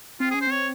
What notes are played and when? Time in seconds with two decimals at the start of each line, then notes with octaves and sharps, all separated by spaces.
0.20 C4 F4
0.31 C#4 G#4
0.41 C5
0.47 C4 C#5